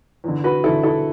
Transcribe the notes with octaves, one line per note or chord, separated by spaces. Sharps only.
E2 D3
F#4 B4
E2 D3 E4 A4
E4 A4